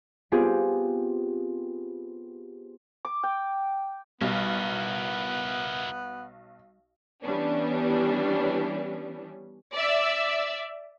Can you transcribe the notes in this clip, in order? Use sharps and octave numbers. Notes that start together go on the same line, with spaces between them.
B3 C4 F4 G4 G#4
D6
G5
B1 G3 B3 E4 A#4
E3 G3 B3 C#4 D4
D5 E5